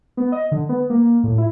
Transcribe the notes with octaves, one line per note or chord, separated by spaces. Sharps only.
B3
D#5
D3
B3
A#3
A2
E4